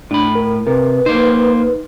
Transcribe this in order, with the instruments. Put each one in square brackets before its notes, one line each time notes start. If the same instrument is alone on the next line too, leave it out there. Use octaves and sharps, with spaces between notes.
[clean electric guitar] A2 B5 [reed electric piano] D4
[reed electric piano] A#4
[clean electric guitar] C3 [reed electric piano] A#4 [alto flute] B4
[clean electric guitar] A#3 C5 [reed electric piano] D#4